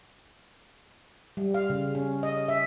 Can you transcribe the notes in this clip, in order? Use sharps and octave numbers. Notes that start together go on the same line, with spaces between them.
G3
F5
C#3
C#4
D#5
E5